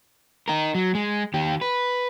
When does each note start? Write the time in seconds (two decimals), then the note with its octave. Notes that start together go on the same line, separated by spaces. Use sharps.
0.48 D#4 A#4
0.75 F#3
0.95 G#3
1.34 D#3 G4
1.61 B4